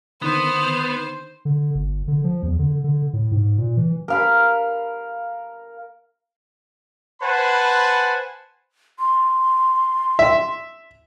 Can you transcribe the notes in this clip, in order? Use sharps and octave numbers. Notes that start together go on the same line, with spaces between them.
D3 D#3 B3 C5
D3
G1
D3
F3
E2
D3
D3
A2
G#2
A#2
E3
A#4 F5 B5
B4 C5 F#5 G#5 A5 B5
C6
E5